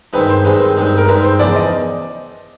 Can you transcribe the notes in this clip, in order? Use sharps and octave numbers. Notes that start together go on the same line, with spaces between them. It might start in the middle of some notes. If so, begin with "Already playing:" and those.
G2 D#3 G#3 C4 D#4 B4
C5
G2 D#3 G#3 C4 D#4 B4
G2 D#3 G#3 C4 D#4
A#4
G2 D#3 G#3 C4 D#4 B4
C5
E2 C#3 F3 D5
D#5